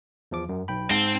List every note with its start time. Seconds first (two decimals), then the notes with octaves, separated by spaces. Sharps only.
0.31 E2 F3 D6
0.49 F#2
0.68 B1 G5 B5
0.90 G#2 C4 F5 A5